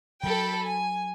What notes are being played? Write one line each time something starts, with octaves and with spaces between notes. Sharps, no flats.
F#3 A4 G5 B5
G#5